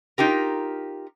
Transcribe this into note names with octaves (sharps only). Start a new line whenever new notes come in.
D#4 F4 G4 A#4